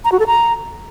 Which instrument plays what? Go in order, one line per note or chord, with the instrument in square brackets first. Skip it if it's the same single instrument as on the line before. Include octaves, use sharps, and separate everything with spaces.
[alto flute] A#5
F#4
A4
A#5